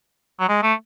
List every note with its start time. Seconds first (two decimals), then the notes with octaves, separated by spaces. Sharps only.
0.40 F#3
0.49 G#3
0.63 A3